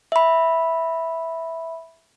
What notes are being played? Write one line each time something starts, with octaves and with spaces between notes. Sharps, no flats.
E5 B5